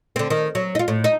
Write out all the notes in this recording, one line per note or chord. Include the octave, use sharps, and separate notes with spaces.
D3 C4
D#3
F#3
D#4 F4
A2
D#4